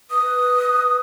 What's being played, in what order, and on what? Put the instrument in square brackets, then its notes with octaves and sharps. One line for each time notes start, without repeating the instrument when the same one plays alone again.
[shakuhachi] B4 [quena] D#6